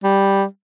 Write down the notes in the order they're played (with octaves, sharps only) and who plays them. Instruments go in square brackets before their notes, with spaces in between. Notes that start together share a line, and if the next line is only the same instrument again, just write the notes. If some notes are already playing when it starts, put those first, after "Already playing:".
[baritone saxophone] G3